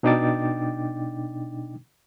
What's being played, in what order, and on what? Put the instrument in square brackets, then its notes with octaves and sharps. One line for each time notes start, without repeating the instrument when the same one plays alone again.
[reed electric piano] B2 D4 D#4 G5 D6 A6